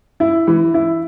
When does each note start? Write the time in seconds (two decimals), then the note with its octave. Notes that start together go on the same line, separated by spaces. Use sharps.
0.20 E4
0.47 E3
0.74 E4